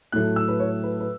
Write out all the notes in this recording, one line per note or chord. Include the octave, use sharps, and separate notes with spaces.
A2 F#3 A3 F#6
E6
B4
C#5
B4
B4